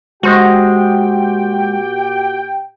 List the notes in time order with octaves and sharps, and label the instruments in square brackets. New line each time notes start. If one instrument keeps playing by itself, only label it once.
[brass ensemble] A#2 G4 G5 [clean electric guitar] G#3 C5 D#5 [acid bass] F#4